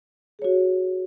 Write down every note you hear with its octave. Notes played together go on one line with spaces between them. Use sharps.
F#4 G#4 C#5